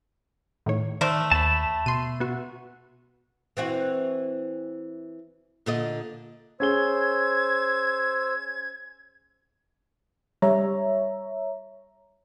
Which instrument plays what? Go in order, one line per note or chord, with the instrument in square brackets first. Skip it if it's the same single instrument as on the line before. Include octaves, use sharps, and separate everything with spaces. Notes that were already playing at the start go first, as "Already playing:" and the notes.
[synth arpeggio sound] A2 D#3 C#5
[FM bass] D#3 [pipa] A3 A#4 C5 [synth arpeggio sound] D5
[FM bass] D#2 [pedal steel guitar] A5 B5
[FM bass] B2 [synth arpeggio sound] C6 D#7
[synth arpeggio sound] B3 F#4
[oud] E3 C4 F#4
A#2 D3 D#5
[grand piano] C#4 G#4 G7 [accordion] C5 E6 [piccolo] G#6
[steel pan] G3 [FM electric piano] C#5 E5 A#5